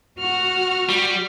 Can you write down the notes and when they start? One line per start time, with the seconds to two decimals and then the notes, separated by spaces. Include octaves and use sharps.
0.19 F#4 F6
0.89 G3